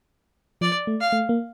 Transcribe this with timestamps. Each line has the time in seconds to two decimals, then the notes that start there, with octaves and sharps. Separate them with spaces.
0.61 F3 D5
0.87 A3
1.01 F5
1.12 A3
1.29 A#3